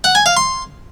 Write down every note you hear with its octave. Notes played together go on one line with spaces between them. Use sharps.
F#5
G#5
F5
C6